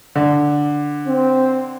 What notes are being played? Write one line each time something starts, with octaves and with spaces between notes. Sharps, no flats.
D3
C4